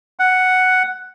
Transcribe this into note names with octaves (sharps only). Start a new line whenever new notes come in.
F#5